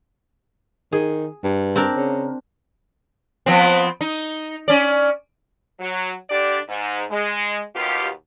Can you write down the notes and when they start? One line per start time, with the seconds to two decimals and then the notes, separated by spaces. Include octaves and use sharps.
0.92 D#3 G#4
1.44 G2
1.76 C4 D4 A#4
1.96 C#3
3.46 F3 B3 C4
4.01 D#4
4.68 C#4 D5
5.79 F#3
6.30 D3 D4 G4 D5
6.69 G#2
7.10 G#3
7.75 D#2 B2 B3 F4 G4